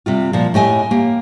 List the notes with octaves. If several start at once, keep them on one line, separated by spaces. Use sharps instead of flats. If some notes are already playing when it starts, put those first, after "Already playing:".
C3 G3 F4
A#2 F3
A2 G4 D#5 G#5
A#3 G4